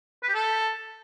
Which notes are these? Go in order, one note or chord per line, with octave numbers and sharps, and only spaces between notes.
B4
G4
A4